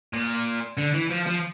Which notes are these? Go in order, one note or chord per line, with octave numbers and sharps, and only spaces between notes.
A#2
D3
E3
F3
F3